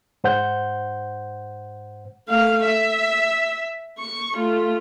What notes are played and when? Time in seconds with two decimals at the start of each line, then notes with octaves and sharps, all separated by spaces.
0.24 G#2 C5 F#5 G6
2.29 A3 F5
2.65 E5
3.98 C#6
4.35 A3 F4